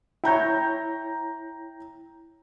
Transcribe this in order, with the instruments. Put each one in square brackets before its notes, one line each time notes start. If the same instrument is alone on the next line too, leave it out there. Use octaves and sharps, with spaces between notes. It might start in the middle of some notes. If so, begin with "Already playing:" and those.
[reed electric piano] E4 C#5 [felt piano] G5 A#5 G6